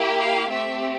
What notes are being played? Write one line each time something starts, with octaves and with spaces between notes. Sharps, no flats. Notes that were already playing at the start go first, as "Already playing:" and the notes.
Already playing: A#3 E4 G4
F5
A3 C4 G4 E5